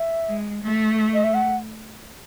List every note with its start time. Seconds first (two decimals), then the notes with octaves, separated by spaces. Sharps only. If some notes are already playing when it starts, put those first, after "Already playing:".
Already playing: E5
0.27 G#3
0.63 A3
1.14 D#5
1.24 E5
1.34 F#5